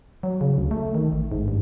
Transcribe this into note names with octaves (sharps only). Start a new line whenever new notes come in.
F#3
C#3
D2
A3
D#3
A1
G#2
G2